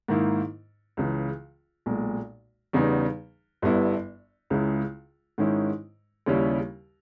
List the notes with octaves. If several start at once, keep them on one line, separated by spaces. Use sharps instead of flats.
G#2 D#3 A#3 E4
C#2 C#3 E3
B1 A#2 G#3
E2 C#3 G3 B3 D#4
G1 G2 G3 B3 E4
C#2 C#3 G#3 C#4 E4
G#2 D#3 G#3 C#4 E4
D#2 C#3 G3 C#4 E4